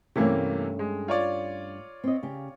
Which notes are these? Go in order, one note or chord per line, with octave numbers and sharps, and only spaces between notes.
G2 C3 E3 A3 A#3 C#4
G#3
F4 C#5 D5
C4 D#5
C#3 G4